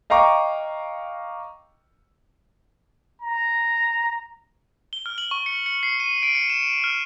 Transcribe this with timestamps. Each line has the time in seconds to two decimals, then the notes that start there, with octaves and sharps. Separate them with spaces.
0.10 D#5 F5 G5 A#5 C#6 D6
3.21 A#5
4.93 G7
5.06 F6
5.18 F#7
5.31 C#6
5.46 C#7
5.66 C#7
5.83 C7
6.00 D#7
6.23 D7
6.35 C#7
6.50 E7
6.84 F6